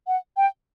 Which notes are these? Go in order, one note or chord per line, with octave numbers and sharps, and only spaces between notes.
F#5
G5